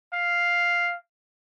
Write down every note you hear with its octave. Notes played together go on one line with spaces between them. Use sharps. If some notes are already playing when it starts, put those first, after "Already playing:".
F5